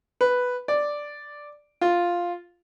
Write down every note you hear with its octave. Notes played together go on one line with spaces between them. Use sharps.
B4
D5
F4